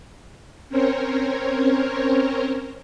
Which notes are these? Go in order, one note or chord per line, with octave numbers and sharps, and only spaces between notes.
C4 C#4 A#4 C5 C#5